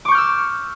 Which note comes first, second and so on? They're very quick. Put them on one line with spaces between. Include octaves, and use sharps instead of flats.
D6 C#6 G6 F6 E6